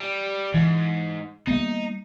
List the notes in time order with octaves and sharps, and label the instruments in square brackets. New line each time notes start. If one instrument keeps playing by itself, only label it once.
[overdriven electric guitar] G3
[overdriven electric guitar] G#2 [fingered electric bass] E3
[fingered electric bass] G3 A#3 B3 [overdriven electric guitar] D#4